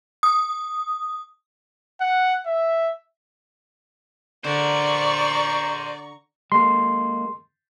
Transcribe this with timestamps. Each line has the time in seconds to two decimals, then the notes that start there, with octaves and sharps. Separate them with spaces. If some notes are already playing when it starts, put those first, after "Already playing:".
0.23 D#6
2.01 F#5
2.46 E5
4.44 D3 A#4 C5 D5 A#5 C#6
6.52 G#3 A#3 C6